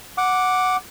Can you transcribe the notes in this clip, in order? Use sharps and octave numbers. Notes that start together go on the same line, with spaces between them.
F#5 D6